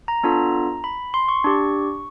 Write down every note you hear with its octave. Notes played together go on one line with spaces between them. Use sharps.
A#5
B3 D4 F4 A4
B5
C6
C#6
D4 G4